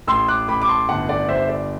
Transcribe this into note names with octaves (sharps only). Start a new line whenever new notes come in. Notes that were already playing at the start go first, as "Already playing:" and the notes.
A1 C6 E6
D6 F#6
A1 B5 D6
D6
A5 C6
G1 F#5 A5
D5 F#5
G3 C5 E5
D5